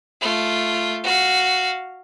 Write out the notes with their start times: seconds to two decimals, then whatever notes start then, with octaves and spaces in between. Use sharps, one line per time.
0.22 A3 F4
1.04 F#4 F5